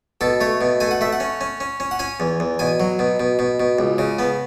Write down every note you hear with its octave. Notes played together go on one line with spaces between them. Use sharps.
B2 A4
A3 C#5
B2
A3 G#5
F#5
A3 E5
F#5
C#4
C#4
C#4
C#4
F#5
C#4 G#5
E2
E2
B2 G#5
F#3
B2
B2
B2
B2
C#2
C#3
B3